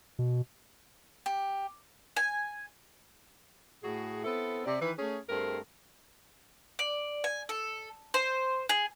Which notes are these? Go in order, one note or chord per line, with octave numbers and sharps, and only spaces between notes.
B2
G4
G#5
A2 F#4 G#4
B3 C4 E4 A4
C3 D5
D#3 E3 B4
A3 C#4 G#4
G2 A3 C4 G#4 A#4
D5
G#5
A4
C5
G#4